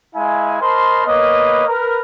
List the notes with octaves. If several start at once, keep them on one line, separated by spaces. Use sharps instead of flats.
G#3 E4 F5 G#5
A#4 C5 D#5 A5 B5 C6
A#3 B3 B4 C#5 D#5
A#4 B4